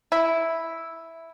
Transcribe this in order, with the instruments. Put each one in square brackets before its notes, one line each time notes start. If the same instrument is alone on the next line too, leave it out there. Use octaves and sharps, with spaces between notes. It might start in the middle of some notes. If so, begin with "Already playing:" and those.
[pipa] E4